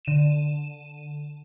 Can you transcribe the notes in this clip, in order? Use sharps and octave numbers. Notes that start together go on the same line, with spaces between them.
D3 D#7 E7